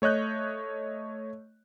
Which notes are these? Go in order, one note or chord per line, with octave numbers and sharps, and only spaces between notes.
A3 C#5 D#5 F#6 G6